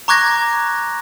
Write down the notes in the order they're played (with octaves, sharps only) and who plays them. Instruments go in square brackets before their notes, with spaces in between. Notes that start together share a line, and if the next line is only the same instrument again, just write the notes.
[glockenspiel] A#5 C#6 D6 F#6 G#6 A#6